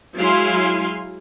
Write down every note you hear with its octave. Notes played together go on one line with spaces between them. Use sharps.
F#3 G#3 E4 F5 G#5 C6